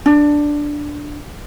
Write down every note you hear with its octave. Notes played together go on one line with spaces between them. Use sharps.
D4